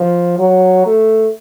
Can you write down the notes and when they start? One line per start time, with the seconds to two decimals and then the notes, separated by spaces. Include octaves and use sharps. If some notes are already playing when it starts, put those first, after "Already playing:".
Already playing: F3
0.39 F#3
0.86 A3